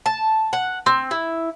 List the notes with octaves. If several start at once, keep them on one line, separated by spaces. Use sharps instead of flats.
A5
F#5
C4
E4